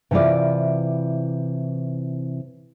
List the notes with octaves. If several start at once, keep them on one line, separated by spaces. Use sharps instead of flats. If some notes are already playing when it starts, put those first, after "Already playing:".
C3 E3 E4 F4 D5